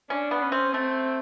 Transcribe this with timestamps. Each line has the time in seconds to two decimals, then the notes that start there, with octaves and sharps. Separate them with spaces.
0.10 C#4 D4
0.31 B3
0.42 C#4
0.52 C4
0.73 A3 C4